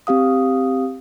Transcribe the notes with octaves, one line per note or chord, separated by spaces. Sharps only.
C4 G4 F5 D#6